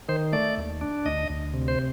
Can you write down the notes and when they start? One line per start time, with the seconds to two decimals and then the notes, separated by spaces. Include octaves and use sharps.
0.09 D#3 C5
0.33 A3 D5
0.58 D#2
0.81 D4
1.05 D2 D#5
1.29 D2
1.54 C3
1.68 C5